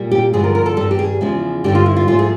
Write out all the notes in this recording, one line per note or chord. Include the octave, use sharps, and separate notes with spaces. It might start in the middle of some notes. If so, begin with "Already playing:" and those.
Already playing: A#2 G3
G4
G2 D3 F3 G#3 G#4
A#4
A#4
A4
G2 D#3 G3 A4
G4
G#4
E2 C#3 F3 G#3
G2 D3 G3 G4
F4
E4
F4
G#2 F3 A3 F4
G#4